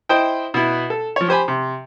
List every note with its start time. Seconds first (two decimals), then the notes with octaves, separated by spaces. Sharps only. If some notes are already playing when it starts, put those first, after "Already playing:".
0.09 E4 C5 D#5 G5
0.54 B2 B3 E4
0.90 A4
1.16 F3 C#5
1.28 G4 C5 G#5 B5
1.48 C3